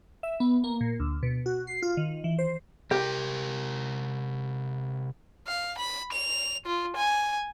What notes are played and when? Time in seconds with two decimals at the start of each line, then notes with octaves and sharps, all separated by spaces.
0.23 E5
0.40 B3
0.64 A#3
0.81 A#2
1.00 D2
1.23 B2
1.46 F#4
1.67 C7
1.82 F4
1.97 D#3
2.24 E3
2.39 C5
2.91 C3 G4 A#4
5.48 F5
5.78 B5
6.12 F7
6.66 F4
6.97 G#5